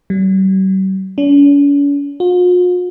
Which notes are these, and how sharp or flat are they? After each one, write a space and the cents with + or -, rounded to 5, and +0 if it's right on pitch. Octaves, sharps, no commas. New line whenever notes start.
G3 -45
C#4 +45
F4 +45